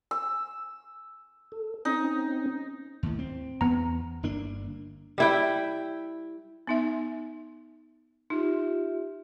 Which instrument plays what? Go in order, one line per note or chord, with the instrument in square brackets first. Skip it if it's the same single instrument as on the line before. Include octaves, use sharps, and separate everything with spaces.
[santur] E6
[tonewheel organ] A4
[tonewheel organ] C4 C#4 [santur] D#4
[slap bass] D#2 A2
C4
[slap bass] E2 [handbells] B3 A#5
[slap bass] G1 A#3 D4
[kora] G3 E4 G5
[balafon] B3 D#4 E5
[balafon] D#4 [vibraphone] F4 G4 E5